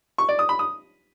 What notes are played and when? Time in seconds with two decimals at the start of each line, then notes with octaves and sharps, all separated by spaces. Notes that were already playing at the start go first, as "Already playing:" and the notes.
0.18 C#6
0.29 D5
0.39 D#6
0.49 B5
0.59 D#6